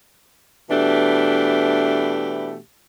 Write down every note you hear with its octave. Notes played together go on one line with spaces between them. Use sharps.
B2 E3 A3 D4 G4